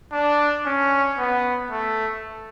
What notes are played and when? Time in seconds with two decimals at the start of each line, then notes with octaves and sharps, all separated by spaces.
0.12 D4
0.65 C#4
1.18 B3
1.71 A3